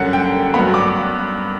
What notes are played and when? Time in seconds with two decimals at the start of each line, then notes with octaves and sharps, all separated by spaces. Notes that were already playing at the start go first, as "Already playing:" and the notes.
Already playing: F#2 D3 G3 C#4 F#5
0.13 G5
0.54 G2 F#3 B3 B5
0.74 D6